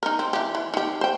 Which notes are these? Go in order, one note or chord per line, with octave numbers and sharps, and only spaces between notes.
D#4 A#4
C4
E3 G4
E3
D#3 G4
C5 G5